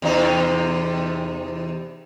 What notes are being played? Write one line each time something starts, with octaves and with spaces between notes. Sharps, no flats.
E2 C3 D#4